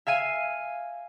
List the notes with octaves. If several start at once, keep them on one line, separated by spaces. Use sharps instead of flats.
E5 F5 G#5 D#7